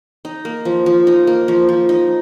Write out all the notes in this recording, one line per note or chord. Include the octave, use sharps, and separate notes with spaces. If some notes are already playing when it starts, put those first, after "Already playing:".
D#4
A#3
F3
F3
D#4
A#3
F3
F3
D#4